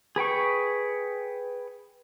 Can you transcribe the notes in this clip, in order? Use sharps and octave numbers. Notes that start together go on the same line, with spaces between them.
G#4 B4 G5 C#6